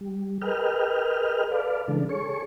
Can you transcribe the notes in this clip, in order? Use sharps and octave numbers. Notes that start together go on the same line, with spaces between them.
G3
G#4 A#4 B4 D#5 G5 F6
A4 B4 D5 F5
C#3 E3 G#3 D4 A4
G#4 A4 C#5 C#6